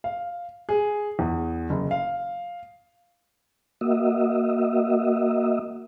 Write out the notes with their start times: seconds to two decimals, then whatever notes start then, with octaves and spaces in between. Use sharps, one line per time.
0.04 F5
0.69 G#4
1.19 E2
1.70 F#1
1.91 F5
3.81 A#3 F#4 D#5 E5